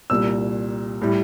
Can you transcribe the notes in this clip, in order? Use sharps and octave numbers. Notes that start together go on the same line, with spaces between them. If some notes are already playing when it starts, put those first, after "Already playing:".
C2 A#2 G3 E6
A2 G3